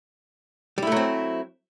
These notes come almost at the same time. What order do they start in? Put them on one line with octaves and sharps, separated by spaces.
G3 E4 A3 F#3 C4